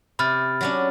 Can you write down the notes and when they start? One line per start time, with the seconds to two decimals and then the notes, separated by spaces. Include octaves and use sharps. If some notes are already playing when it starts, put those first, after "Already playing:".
0.19 C3 B5 F6 A6
0.61 F#3 C#4 D4